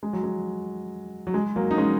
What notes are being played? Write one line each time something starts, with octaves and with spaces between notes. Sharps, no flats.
G#3
F#3
G#3
F#3
G#3
F#3 A#3
D#4
G#3 C#4